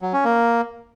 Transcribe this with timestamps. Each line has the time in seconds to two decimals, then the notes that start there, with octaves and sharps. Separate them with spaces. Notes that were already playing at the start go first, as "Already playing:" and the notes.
0.01 F#3
0.13 C#4
0.25 A#3